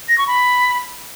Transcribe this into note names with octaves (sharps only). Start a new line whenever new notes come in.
A#6
C#6
B5